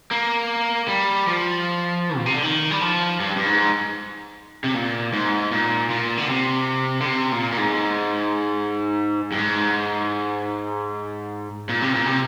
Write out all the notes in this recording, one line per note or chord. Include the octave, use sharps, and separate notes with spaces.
A#3
G3
F3
A#2
C3
D3
D#3
G3
F3
G2
G2
G#2
C3
A#2
G#2
A#2
A#2
D3
C3
D3
C3
A#2
A#2
G#2
G2
G#2
A#2
C3
A#2
C3